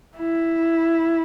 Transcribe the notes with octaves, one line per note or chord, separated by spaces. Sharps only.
E4